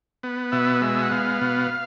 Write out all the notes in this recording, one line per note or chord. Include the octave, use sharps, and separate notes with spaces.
B3
B2 E5
G#3 E5
F#5
B3 F5
B2